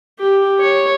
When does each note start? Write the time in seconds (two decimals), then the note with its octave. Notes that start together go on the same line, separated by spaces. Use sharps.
0.20 G4
0.60 C#5